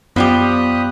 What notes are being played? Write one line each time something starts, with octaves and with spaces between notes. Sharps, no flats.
F#2 F3 G3 B3 G4 B5 D#6 F#6